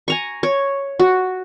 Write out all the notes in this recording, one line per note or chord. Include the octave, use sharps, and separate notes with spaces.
G#5 A#5 C#6
C#5
F#4